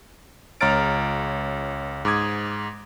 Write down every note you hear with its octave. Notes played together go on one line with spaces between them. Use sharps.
C#2 C#5 A#5 F6 A6 D7
G#2 D6 D#6 G#6